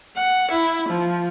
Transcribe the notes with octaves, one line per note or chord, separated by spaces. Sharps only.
F#5
E4
F3